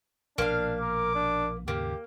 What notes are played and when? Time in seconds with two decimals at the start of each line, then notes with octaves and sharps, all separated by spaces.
0.38 A#1 B2 A#3 D4 F5
0.81 A#4 D6
1.15 D4
1.68 D#2 G#2 C#3 A#3 G4